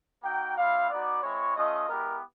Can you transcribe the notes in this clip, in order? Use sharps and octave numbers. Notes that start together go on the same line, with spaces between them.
A#3 D#4 F#4 G5
G3 C4 E4 F5
B3 D#4 F#4 D5
G#3 C4 E4 C#5
A3 C#4 F4 D#5
G#3 B3 E4 G4 A#4